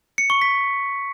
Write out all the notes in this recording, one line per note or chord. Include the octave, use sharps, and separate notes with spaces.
C#7
C#6
B6